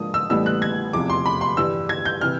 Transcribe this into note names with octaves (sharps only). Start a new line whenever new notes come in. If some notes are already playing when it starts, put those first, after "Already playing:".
Already playing: G#2 F3 A#3 D4 D#6
E6
A1 A2 E3 G3 B3 E6
F#6
G#6
F1 E2 C3 F3 D6
C6
B5
C6
G2 E3 G3 E6
G#6
G6
C3 E3 F6